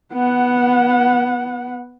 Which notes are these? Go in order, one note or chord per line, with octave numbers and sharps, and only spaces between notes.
B3 F#5